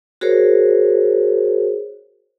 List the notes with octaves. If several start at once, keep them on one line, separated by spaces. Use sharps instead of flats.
F#4 G#4 A#4 C5 C#5